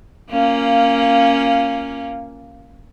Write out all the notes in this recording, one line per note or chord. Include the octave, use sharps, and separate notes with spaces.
A#3 C#4 F4